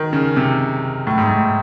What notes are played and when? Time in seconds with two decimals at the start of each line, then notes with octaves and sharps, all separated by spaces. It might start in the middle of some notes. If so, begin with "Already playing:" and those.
Already playing: D#3
0.13 C#3
0.36 C3
1.07 A2
1.18 G#2
1.29 A2